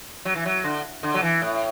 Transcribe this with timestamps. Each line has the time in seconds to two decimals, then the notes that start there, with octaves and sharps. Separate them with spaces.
0.25 F#3
0.35 E3
0.46 F#3
0.64 D3
1.03 D3
1.14 F#3
1.22 E3
1.42 A2